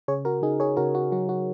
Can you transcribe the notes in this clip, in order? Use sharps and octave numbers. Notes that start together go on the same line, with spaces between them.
C#3 G#4 C#5
F#4 A#4
C#3 D#4 G#4
G#4 C#5
C#3 F#4 A#4
F#4
F#3 F#4
F#4